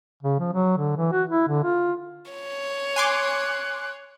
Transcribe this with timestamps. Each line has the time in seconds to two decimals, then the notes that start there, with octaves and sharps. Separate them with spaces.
0.23 C#3
0.40 F3
0.53 F#3
0.78 D3
0.97 E3
1.12 F#4
1.30 E4
1.48 D3
1.64 F4
2.31 C#5
2.96 G#5 C6 D6 F#6